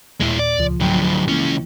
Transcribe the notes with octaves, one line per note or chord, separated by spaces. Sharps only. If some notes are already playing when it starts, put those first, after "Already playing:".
D#2 A#2 G#3 E4
D5
C#2 F3
G#2 D3 F#3 G5
F3
C#2 E3 A#3 C#4